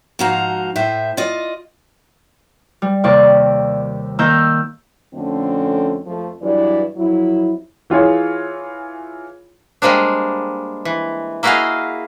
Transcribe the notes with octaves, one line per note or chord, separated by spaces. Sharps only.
G#2 F3 D#4 F#4 F5 A#5
A2 C5 E5
F4 D5 D#5
G3
D#2 C3 A#3 D5 C#6
D#3 A#3 A#5 E6 G6
F2 D3 A3 C4 C#4
F2 F3 A3
G2 E3 F#3 E4 D5
F2 F#3 E4
E3 F4 G#4 C#5
G3 G#3 A#3 C4 D4
E3
A#3 E4 F#4 G#4 D#5 F5